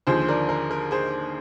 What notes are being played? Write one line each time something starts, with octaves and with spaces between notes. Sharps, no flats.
D#2 D3 F3 G#4 C5
C5
A#4 D5
A#4
A#4
G#4 C5